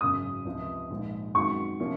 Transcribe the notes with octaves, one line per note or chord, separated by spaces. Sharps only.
G#1 F#2 C#3 D#6
C#2 C3 F3
A#1 G#2 F3
F#2 D#3 G#3 C4 F#4 C#6
C3 F3 A#3 C#4